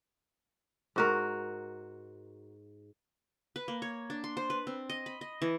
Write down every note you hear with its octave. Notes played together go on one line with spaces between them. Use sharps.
G#2 F#4 A#4
B4
A#3
C#5
D4
C6
C5
B4
C4
D#5
B5
D#5
E3